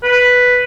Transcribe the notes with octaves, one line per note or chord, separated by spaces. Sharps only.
B4